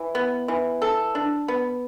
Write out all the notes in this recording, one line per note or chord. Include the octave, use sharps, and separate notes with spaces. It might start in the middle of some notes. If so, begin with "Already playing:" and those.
Already playing: E3
B3
E3
A4
D4
B3